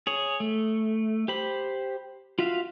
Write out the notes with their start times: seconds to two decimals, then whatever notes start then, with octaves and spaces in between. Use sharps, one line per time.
0.07 G#4 C#5
0.40 A3
1.28 G4 C5 B5
2.39 F4 F#4 E5 F5